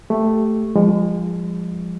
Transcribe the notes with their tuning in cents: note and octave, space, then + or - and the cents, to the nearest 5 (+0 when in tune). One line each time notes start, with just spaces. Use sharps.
A3 +0 G4 +0
F3 +0 G#3 -35